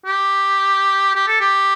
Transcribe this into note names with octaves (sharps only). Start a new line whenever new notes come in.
G4
G4
A4
G4